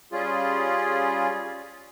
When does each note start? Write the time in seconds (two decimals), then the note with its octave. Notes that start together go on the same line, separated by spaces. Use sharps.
0.12 G3 C#4 F4 G#4